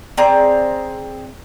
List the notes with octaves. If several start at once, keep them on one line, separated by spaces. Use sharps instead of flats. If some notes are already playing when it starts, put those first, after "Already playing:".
C4 G#4 D5 A#5